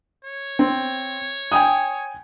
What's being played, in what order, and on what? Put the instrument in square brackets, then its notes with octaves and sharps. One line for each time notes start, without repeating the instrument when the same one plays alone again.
[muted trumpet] C#5
[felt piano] C4
G5 G#5 D#6